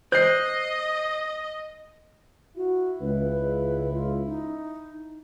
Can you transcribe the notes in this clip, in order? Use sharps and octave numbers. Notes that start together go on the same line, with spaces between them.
C5 D#5 G6 C7
E4 F#4
C#2 B4
F4
D#4